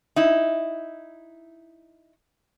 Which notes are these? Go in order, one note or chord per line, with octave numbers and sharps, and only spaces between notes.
D#4 E4